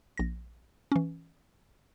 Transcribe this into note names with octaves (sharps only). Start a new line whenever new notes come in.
A#1 A#6
E3 C#4